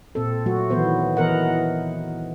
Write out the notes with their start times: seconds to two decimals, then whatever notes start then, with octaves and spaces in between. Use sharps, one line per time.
0.15 A#2 C4 A4
0.46 F#3 A3 F#4
0.70 D#3 E3 F#3 B3 C5
1.17 E3 B3 A#4 D#5 F#5